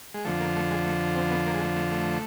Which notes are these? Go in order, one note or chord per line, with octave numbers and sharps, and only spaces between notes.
G#3
F2 D3 F3 A3
A#3
A3
G#3
A3
C4
B3
A#3
G#3
A3
A3
A3